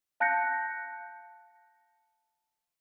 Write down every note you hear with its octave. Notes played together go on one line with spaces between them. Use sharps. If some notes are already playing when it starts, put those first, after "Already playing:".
F5 A5 F#6 G6 A#6 C#7